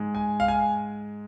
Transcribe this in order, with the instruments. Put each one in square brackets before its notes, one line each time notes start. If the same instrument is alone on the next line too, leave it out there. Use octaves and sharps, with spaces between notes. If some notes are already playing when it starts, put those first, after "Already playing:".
Already playing: [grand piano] G#2 G#3
G#5
F5
G#5